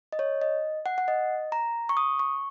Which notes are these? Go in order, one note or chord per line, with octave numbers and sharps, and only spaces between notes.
D#5
C#5
D#5
F#5
F#5
D#5
A#5
C#6
D#6
C#6